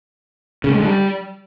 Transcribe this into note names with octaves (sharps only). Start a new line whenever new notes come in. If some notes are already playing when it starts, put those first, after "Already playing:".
C#3
A3
G#3
D3
G3